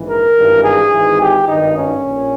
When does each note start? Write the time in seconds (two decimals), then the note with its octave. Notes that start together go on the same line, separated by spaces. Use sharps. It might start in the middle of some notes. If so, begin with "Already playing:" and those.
Already playing: A#1 G#2 E3
0.08 A#4
0.37 G#1 G2 E3
0.65 G#4
0.92 G#1 G#2 E3
1.21 G4
1.48 G#1 G2 D#3 D#4
1.77 C#4
2.05 A#1 A#2